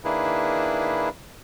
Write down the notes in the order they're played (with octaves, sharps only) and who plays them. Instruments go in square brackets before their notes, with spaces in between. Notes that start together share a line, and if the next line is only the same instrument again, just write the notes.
[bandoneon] D#3 A#3 D4 E4 G#4 B4